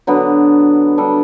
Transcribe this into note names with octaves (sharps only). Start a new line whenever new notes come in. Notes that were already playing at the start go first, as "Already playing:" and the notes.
D3 F#3 B3
G3 D4 A4